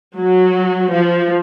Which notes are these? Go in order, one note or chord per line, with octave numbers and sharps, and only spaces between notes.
F#3
F3